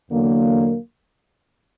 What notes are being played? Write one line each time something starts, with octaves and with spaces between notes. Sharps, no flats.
E2 D3 F#3 A#3